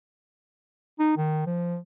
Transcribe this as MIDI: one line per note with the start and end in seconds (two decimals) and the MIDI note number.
0.99 1.12 63
1.17 1.46 51
1.47 1.78 53